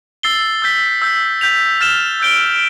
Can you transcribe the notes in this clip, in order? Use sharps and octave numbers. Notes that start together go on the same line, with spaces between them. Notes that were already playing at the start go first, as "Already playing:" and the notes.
E6 A6 C7 G7
E6 G6 B6
E6 G6 B6
G6 B6 F7
F6 A6 E7 G7
E6 G6 D7 G7